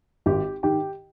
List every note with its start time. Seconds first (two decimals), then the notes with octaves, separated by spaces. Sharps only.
0.26 G#1 G4 G5
0.63 G#2 D#3 G4 G5